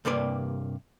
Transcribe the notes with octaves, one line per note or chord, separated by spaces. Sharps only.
G2 C3 A#3 B4 D5